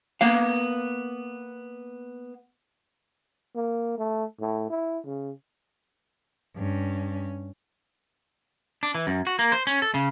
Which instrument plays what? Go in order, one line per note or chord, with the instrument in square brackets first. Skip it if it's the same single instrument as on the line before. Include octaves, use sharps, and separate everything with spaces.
[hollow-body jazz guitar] A#3 B3 F5
[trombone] A#3
A3
A2
E4
C#3
[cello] G2 C#4
[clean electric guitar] D4
E3
F#2
F#4
A#3
C5
C#4
A4
C#3